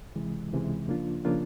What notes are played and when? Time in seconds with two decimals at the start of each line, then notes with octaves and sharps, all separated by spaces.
0.15 C#2 C3 E3 G#3
0.52 C#2 C3 E3 G#3
0.88 C#3 F3 A#3 D4 F4
1.25 C#3 F3 A#3 D4 F4